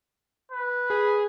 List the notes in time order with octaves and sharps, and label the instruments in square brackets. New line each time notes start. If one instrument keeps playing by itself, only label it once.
[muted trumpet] B4
[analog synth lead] G#4